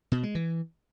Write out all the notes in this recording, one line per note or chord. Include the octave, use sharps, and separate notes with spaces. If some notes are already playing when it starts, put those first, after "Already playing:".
B2
G#3
E3